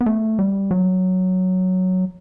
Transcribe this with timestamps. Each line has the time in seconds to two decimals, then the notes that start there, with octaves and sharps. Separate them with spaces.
0.01 B3
0.06 A3
0.39 G3
0.71 F#3